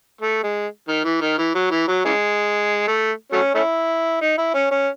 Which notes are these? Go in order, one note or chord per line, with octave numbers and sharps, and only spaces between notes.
A3
G#3
D#3
E3
D#3
E3
F#3
E3
F#3
C#3 E3 G#3
A3
F#3 A3 C#4
A3 C#4 E4
D#4
E4
C#4
C#4